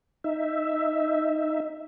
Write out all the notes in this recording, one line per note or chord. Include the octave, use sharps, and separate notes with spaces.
D#4 E5